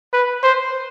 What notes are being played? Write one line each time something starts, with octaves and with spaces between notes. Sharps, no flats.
B4
C5